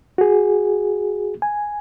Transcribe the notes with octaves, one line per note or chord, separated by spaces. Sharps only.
F#4 G#4
G#5